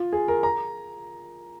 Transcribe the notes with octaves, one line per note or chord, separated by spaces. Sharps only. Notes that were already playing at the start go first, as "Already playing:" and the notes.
Already playing: F4
G#4
A#4
A#5